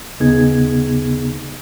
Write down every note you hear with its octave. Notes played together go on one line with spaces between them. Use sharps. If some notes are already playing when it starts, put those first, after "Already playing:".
D#2 C#3 B3 D#4 G#4 G#6